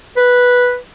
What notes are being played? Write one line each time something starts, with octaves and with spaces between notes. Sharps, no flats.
B4